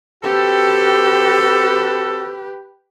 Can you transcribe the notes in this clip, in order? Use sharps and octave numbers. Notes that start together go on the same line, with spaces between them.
C4 F#4 G4 A4 B4